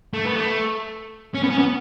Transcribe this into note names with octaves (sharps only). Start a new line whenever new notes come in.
A3
B3
A3
C#4
B3
C#4
B3